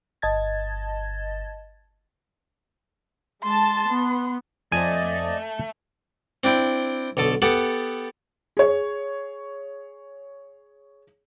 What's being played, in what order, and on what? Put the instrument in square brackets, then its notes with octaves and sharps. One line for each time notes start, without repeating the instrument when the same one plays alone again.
[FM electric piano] G1 D#5 A5 G#6 A6
[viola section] G#3 A5 [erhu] C6
[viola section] B3
[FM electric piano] F2 C4 [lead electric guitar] A3 [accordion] D5 D#5 [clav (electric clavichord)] G#5
[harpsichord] C4 D4 E4 G5
B1 D3 A4 A5
B3 G4 A4 F#5 A5 B5
[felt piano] G#4 C#5